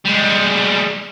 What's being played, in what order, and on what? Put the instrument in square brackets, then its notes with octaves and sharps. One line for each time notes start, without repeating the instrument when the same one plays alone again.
[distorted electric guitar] G3 G#3